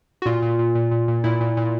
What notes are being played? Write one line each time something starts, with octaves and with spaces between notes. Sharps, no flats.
F#4
A#2 F4
A#2
A#2
A#2
A#2
A#2
A#2 E4
A#2
A#2